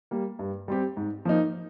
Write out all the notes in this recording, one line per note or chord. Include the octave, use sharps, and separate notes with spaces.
G3 A#3
G2
G3 C4 G4
G#2
F3 A#3 D#4